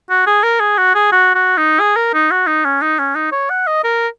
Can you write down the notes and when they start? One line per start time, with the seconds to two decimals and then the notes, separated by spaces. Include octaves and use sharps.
0.10 F#4
0.27 G#4
0.43 A#4
0.60 G#4
0.78 F#4
0.95 G#4
1.12 F#4
1.35 F#4
1.57 D#4
1.80 G#4
1.96 A#4
2.14 D#4
2.31 F#4
2.47 D#4
2.65 C#4
2.82 D#4
2.99 C#4
3.15 D#4
3.32 C#5
3.50 F#5
3.67 D#5
3.84 A#4